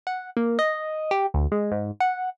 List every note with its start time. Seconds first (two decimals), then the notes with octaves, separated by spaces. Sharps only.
0.07 F#5
0.37 A#3
0.59 D#5
1.11 G4
1.34 D2
1.52 G#3
1.72 G#2
2.00 F#5